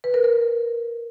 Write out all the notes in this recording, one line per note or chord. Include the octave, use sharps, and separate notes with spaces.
B4
A#4
A#4